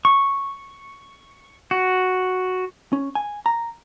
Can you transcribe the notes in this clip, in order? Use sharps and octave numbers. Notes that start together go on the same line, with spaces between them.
C#6
F#4
C#4
G#5
A#5